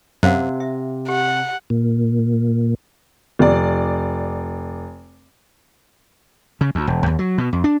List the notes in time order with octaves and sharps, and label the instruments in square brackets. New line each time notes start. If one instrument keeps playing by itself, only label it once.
[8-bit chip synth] F#2 [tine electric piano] C3 [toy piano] C5 F5 F#5
[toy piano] E5
[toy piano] G4 [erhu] F#5
[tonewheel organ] A#2
[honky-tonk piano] F1 D5
[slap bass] C#3
D2
E1
D#2
F#3
B2
F2
D4